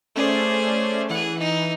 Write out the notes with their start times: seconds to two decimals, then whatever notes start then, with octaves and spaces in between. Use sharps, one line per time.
0.15 A3 C#4 G#4 C5 D5
1.10 E3 G#4 F#5
1.40 D#4